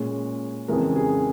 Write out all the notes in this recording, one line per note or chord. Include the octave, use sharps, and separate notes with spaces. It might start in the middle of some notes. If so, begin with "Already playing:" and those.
Already playing: A#2 G#3 C#4
F2 C#3 E3 G#3 A#4
G#4